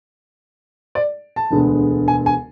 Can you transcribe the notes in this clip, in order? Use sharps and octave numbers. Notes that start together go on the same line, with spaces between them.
D5
A5
E1 D2 D3 G#3 B3
G#5
G#5